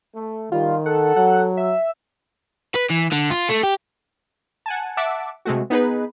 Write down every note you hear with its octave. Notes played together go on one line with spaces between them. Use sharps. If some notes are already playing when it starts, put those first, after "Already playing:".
A3
D#3 G3 F4
A4 F#5
F#3 F#5
E5
B4
E3
D3
F4
A3
G4
F#5 G#5 A5
E5 F#5 A5 D6
C3 G#3 A3 F#4
B3 D#4 G#4 B4